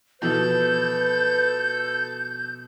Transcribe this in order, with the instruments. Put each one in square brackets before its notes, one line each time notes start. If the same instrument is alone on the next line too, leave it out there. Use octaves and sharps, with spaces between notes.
[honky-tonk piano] B2 E3 F3 [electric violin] A4 [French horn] B4 [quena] G6